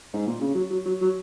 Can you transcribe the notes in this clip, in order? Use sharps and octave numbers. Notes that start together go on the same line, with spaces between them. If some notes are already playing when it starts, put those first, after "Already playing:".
G#2
A#2
C#3
F#3
F#3
F#3
F#3